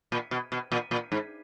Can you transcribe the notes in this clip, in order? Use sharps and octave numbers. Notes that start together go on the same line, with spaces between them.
A#2
B2
B2
A#2
A#2
G#2